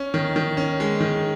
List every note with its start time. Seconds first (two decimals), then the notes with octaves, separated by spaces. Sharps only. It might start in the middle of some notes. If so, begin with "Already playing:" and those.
Already playing: C#4
0.14 D#3
0.36 D#3
0.57 C#4
0.80 G#3
1.00 D#3